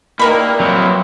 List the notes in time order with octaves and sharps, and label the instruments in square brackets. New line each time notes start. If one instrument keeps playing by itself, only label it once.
[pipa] D#3 A#4 B5 [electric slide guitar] A#3 [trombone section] D4 E4 G4
[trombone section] B1 F2 E4 [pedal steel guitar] F#3 [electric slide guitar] A#3 C4